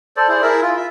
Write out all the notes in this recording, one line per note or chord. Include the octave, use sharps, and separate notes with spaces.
A4 C5 D5
E4 G#4 C5 D5
E4 G#4 A#4 E5
F4
E5